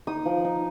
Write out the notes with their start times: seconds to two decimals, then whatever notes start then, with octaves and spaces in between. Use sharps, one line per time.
0.07 D#4 D#6
0.26 F3
0.45 D#4